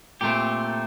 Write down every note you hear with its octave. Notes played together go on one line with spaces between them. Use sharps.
A#2 A3 C4 G4